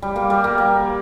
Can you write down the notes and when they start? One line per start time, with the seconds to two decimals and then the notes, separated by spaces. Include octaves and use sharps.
0.02 G3
0.16 A#3
0.30 G3
0.44 A#3
0.58 A#3